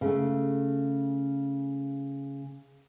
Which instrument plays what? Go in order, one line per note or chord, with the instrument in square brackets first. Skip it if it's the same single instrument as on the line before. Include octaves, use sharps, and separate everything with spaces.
[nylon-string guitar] C#3 A3